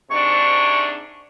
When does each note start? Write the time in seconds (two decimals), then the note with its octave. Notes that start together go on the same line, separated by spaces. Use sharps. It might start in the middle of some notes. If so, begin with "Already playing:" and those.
0.11 G#2 C3 D4 C#6